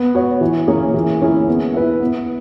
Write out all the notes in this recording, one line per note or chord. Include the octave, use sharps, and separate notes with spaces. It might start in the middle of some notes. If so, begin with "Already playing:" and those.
Already playing: B3
F#4 C#5
E3
A#3 C#4 G#4 C#5
E3
A#3 C#4 E4 G#4
B3
E4 B4 E5
B3